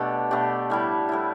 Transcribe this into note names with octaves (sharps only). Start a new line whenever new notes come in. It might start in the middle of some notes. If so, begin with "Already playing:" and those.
Already playing: B2 A3 D4 G4 A4
B2 A3 D4 G4
A2 G3 E4
A2 G3 E4